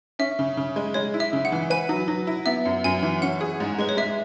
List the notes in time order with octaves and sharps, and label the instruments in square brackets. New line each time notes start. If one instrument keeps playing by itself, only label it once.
[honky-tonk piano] C#4 [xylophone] E5
[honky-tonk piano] C#3
C#3
G#3
[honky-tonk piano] G#3 [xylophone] C#5
[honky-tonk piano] E4
[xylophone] E5
[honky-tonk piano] C#3
[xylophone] F#5
[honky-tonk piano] E3
[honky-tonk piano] B4 [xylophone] G#5
[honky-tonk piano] F#3
F#3
E4
[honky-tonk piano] B3 [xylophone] E5
[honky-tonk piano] F#2
[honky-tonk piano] F#2 [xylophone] G#5
[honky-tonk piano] E3
[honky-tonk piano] C#4 [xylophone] F#5
[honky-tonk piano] G#4
G#2
[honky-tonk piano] G#3 [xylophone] B4
[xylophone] C#5
[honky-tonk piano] G#3 [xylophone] E5